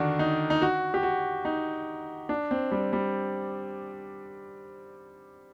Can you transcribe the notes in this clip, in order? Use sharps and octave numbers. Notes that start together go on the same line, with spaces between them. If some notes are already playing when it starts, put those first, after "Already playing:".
Already playing: D3 D#3 D4 F#4
D#4
D#4
F#4
G4
F#4
D#4
D4
C4
G3
G3